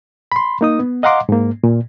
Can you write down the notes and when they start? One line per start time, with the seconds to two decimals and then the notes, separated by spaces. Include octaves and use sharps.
0.32 B5 C6
0.61 A#3 D#4 D#6
0.79 B3
1.03 D#5 F5 F#5 A#5 C6 D6
1.29 G#2 A#3
1.64 A#2